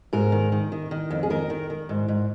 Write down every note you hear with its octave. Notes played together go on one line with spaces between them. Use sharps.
G#2 A#4
D#3
D#3
D#3
D#3
F2
G#4
D#3 A#4
D#3
D#3
G#2
G#2